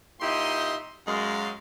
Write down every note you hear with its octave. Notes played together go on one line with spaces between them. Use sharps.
A#2 D#4 E4 G4 D#5 C6
F#2 G#3 F5